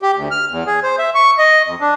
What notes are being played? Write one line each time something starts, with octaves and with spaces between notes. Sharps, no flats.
G4
D2
F6
E2
G#4
C5
E5
C#6
D#5
F2
D4